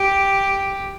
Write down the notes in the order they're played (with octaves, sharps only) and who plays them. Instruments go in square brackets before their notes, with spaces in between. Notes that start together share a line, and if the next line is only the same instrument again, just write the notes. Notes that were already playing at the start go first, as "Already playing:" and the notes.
Already playing: [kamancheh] G4